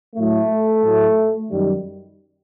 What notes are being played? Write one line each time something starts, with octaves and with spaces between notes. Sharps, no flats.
A2 F#3 A3
A2 F#3
F#2 D#3 G3